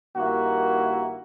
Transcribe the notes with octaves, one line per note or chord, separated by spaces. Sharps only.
G2 D#3 A#3 E4 F#4